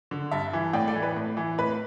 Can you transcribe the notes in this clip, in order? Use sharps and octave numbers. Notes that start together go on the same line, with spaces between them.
D3
G2 E5 A5
E3
A2 D5 G5
A4 D5
E3
B4
A2
E3
A2 B4